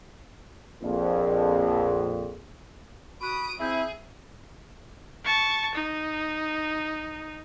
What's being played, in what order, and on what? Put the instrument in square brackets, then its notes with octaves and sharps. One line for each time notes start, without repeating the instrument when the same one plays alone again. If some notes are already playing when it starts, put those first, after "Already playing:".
[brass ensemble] A#1 F2
[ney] F#4 [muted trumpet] B5 [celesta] C#6 F#6 [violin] D#6 D7
[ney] C4 [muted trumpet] E4 [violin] G#4 [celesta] E5 E6 G6
[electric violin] A5 C#6
D#4